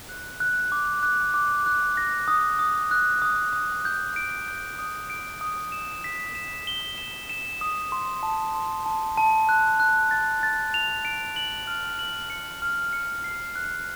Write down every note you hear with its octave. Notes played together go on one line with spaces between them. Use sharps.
F#6
F#6
D6
F#6
D6
F#6
A#6
D#6
D#6
F#6
D#6
D#6
G6
D7
G6
D#6
D7
D#6
E7
B6
E7
G7
E7
E7
D#6
C6
A5
C6
A5
A5
F#6
F#6
A6
A6
F7
D7
F#7
F6
F#7
C#7
F6
C#7
C7
F#6